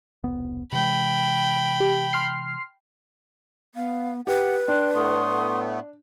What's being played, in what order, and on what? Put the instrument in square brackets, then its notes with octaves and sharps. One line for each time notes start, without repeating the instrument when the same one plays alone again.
[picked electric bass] E1 C2 B3
[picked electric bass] C3 E3 G#3 [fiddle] G5 B5
[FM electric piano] G4
C6 F6 C7
[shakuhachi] B3 [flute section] F5
[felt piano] G4 [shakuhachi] B4 [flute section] F#5
[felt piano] D4 [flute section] G5 C6 F#6
[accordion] A2 A3 B3 [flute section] C6 C#6 D#6